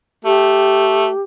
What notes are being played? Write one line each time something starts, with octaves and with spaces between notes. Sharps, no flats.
A3 G4